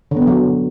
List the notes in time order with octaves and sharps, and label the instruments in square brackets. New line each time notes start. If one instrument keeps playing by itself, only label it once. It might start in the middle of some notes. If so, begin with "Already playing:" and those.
[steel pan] D3
B3
D3
F#3